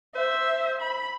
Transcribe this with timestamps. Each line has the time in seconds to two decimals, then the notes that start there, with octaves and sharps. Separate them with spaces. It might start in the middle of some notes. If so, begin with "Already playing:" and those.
0.15 C5 E5
0.81 B5